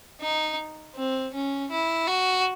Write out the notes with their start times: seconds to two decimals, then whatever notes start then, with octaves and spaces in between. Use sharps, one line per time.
0.21 D#4
0.95 C4
1.34 C#4
1.71 E4
2.08 F#4